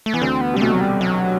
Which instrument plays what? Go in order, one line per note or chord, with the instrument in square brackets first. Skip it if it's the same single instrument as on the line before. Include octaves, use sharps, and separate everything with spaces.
[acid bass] A3
[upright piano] E3 [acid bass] B3
[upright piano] D2 D3 [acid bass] C4
[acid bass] B3
[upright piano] C3
[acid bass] G3
[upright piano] B1 B2 [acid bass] A3
[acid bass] F#3
G3
F#3